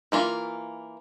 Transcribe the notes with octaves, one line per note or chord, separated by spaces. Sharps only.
E3 A#3 F4